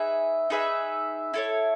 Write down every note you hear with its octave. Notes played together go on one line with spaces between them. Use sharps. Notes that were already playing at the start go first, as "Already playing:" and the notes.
Already playing: D#4 G#4 B4 E5
D#4 G#4 B4 E5
E4 A4 C#5